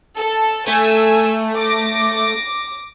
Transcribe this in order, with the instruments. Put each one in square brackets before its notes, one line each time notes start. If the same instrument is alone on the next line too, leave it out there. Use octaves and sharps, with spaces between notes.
[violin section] A4
[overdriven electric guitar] A3 [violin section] G#5 E6
[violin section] D6 A#6